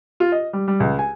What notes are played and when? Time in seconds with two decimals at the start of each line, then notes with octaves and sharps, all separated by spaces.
0.20 F4
0.32 D#5
0.53 G3
0.68 G3
0.80 C#2
0.99 G#5